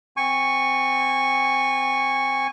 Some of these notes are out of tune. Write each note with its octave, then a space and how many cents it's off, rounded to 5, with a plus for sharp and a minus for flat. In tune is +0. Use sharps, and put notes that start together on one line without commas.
C4 -20 G#5 -25 C#6 +0